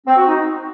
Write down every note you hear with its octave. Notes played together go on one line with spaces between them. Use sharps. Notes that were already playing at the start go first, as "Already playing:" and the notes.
C4
F#4
D#4